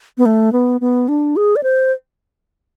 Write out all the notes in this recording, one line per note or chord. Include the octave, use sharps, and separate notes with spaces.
B3
A3
B3
B3
D4
G#4
D5
C5